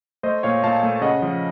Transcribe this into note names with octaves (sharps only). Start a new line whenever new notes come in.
A3 C5 D#5
A#2 C#5 F5
A#2 F5 A5
A3
C#3 D#5 F#5
F3